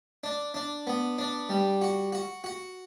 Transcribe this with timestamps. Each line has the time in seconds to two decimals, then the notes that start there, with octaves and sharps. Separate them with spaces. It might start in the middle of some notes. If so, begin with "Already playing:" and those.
0.24 D4
0.54 D4
0.87 B3
1.18 D4
1.49 G3
1.82 F#4
2.13 F#4
2.44 F#4